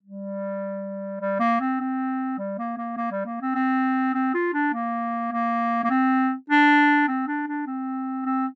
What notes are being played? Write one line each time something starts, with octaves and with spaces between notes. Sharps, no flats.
G3
G3
A#3
C4
C4
G3
A#3
A#3
A#3
G3
A#3
C4
C4
C4
F4
D4
A#3
A#3
A#3
C4
D4
C4
D4
D4
C4
C4